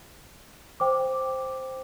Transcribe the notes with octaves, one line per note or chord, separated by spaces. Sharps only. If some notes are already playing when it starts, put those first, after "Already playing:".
C5 G5 D6